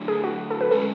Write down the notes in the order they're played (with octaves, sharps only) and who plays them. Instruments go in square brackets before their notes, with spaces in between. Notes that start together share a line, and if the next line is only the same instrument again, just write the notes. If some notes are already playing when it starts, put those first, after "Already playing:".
Already playing: [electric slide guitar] D3 F#3 A3
[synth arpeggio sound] G#4
F#4
A4
B4
[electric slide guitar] D3 G#3 C#4 [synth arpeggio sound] A4